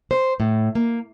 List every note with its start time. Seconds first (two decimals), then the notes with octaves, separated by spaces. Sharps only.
0.11 C5
0.40 A2
0.75 A#3